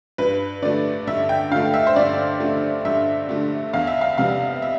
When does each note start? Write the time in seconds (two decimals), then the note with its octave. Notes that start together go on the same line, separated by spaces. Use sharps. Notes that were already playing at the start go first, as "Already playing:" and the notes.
0.18 G2 B4
0.62 D3 A3 D5
1.07 G2 E5
1.29 G5
1.51 D3 A3 F5
1.74 E5
1.87 C5
1.96 G2 D5
2.40 D3 A3
2.85 G2 E5
3.29 D3 A3
3.73 E2 F5
3.87 E5
4.01 F5
4.18 C3 G3 B3 F5
4.62 E5